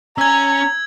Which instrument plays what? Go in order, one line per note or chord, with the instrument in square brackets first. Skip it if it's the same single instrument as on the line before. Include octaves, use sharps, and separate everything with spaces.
[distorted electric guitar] C#4 [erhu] A#5 [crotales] E6 G#6